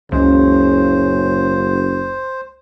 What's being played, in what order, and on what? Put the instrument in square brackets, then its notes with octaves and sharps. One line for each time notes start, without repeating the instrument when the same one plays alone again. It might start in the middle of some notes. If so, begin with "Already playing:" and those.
[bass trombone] F#1 [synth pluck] C#2 E3 G#3 [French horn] C#3 [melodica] C5